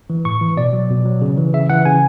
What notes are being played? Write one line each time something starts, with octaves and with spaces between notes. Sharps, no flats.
E3
A2 C#6
E3
B2 D5
F#3
B2
F#3
C#3
E3
C#3 E5
E3 F#5
C#3 G#5